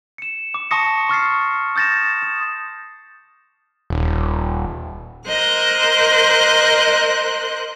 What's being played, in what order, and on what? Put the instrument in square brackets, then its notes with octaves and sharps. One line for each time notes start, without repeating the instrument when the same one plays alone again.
[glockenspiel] C#7 E7
D6
A5 C6 C#6 D#6 A#6 C#7
C#6 F6 A6 C7
D#6 G6 A6 A#6 E7
D#6
[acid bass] D#1
[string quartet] A#4 C5 D#5 F#6